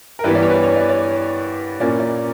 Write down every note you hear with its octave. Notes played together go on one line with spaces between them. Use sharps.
A#4
G2 E3 G3 B3 B4
D5
C#5
B4
C#5
D5
D5
A#2 A#3 C#4 D5
D5